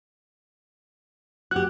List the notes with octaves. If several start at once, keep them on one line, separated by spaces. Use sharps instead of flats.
F#4 G4 F#6